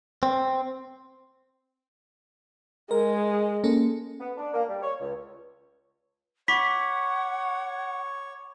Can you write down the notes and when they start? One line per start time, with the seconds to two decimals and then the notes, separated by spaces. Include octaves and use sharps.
0.23 C4
2.91 G#3 A#4
3.64 A#3 C#4 A4
4.21 B3
4.38 D4
4.54 A#3
4.69 G3
4.82 C#5
5.01 C#2
6.48 C#5 F#5 B5 C#6 D6 B6